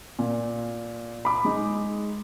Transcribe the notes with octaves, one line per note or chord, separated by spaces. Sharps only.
A#2
B5 D6
G#3 D#4